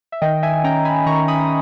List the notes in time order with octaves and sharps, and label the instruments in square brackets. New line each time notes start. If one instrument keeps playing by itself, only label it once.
[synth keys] E5
D#3 D#5 G5
E5 G#5
C#4 G5 A#5
G#5 B5
D#3 A#5 C#6
B5 D#6